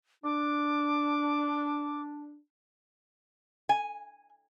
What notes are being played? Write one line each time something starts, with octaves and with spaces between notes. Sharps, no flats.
D4 D6
G#5